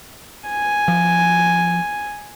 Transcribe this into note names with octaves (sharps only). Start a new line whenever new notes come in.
G#5
F3